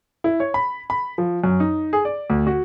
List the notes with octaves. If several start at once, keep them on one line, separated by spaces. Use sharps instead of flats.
E4
C#5
B5
B5
F3
F#2
D#4
G#4
D5
D2
F#4